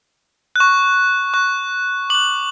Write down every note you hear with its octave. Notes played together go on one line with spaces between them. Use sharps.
C#6 F#6
C#6 F#6
D6 F#6 F#7